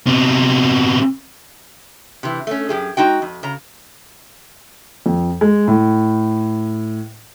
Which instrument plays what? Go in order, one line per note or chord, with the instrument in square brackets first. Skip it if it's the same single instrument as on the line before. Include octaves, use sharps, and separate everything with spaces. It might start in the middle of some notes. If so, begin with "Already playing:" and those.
[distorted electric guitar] C3 B3
[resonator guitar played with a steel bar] C3 E3
A3 C#4
F#2 G4 G#4
G#3 D#4 F#4 G5
F2
C#3 A#5
[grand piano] F2
G#3
A2